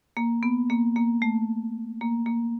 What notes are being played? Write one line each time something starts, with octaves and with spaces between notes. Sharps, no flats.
A#3
B3
A#3
A#3
A3
A#3
A#3